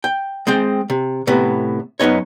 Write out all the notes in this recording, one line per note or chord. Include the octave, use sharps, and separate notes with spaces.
G5
G#3 C4 G5
C3
A2 C3 B3
F#2 C3 B3 D#4 C#5